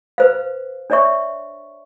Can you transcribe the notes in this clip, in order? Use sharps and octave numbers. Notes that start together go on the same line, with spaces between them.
B4 C5 F5
D4 C#5 D5 E5 C#6